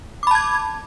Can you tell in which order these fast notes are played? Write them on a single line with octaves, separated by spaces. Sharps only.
D6 B5 A5 G#6